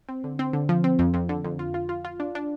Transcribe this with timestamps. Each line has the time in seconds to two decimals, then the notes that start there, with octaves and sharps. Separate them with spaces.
0.09 C4
0.24 D3
0.39 C4
0.53 D3
0.69 F3
0.84 C4
0.99 F2
1.14 F2
1.29 D3
1.45 F2
1.59 F4
1.74 F4
1.89 F4
2.05 F4
2.20 D4
2.35 D4